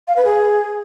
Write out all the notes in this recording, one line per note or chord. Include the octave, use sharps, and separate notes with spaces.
F5
B4
G#4